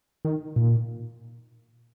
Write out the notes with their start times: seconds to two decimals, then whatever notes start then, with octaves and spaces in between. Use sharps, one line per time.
0.25 D#3
0.56 A#2